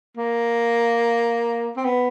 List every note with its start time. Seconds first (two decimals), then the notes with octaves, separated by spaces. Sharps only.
0.17 A#3
1.77 C4
1.85 B3